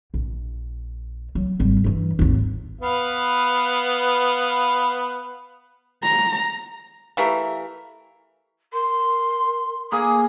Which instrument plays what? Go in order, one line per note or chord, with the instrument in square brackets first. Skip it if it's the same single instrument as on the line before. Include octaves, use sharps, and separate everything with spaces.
[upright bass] A#1
F#3
G#1 G3
G2 E3
G#1 D#2
[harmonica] B3 B4 F5
[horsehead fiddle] A#5
[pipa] E3 A3 A#4 [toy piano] G4 E5 F5
[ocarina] A#4 [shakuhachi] C6
[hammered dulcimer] A#3 G#4 [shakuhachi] D#6